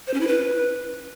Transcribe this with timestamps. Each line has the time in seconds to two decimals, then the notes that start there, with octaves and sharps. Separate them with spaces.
0.07 C5
0.14 C#4
0.20 E4
0.27 B4